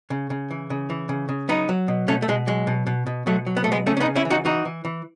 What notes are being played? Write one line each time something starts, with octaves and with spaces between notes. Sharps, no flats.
C#3
C#3
E3
C#3
E3
C#3
C#3
F#3 B3 D#4
F#3
B2
B2 A3 C#4
A3
B2 G#3
F#3 G#3
B2
B2
B2
B2 F#3 A3
F#3
B3
B2 A3
G#3 B3
C#3 A3 C#4
C#4
B3 D#4
C#3
C#4 E4
E3
D#4 F#4
E3 D#4 F#4
E3
E3